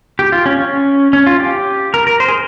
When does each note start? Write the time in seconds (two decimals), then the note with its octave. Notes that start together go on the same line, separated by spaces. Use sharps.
0.19 G4
0.32 F4
0.46 C#4
0.59 C#4
1.13 C#4
1.26 F4
1.40 G4
1.94 A#4
2.07 A#4
2.20 C5
2.28 G#4